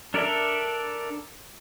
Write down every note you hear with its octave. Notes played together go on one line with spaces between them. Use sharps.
D4 A4 A#4 D5 E5